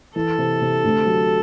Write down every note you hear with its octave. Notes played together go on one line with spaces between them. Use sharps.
E3 A4
C3
C3
D2
F#3